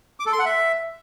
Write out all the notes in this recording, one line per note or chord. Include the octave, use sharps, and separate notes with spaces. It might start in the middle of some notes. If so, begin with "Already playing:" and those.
D6
A4
C6
F#5
E5